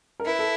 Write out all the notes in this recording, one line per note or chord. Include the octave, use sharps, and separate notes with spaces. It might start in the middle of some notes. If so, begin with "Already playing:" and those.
A#4
E4 B4
A4